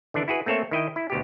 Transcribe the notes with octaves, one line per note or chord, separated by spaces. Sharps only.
D3 E3 D4
E4 F#4 G#4 B4
A3 A#3 C4 A4 C#5 E5
D#3 E4 D#5 G5
E4
D2 B2 G4